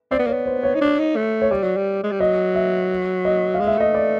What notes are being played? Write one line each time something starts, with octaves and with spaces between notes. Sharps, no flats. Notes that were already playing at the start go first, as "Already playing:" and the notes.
C4 D5
B3
A#3
C#5
B3
C5
C#5
D#4
D4
D#4
A3
C#5
G3 D5
F#3
G3
G#3
G3
F#3 D#5
E5
D#5
F5
G#3
E5
A3 D#5
D5